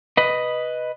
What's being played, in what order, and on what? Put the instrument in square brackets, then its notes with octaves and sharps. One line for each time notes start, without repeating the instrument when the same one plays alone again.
[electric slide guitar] B4 D#5